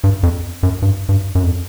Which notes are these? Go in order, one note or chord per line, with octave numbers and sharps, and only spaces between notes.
G2
F2
F#2
G2
G2
F#2
F2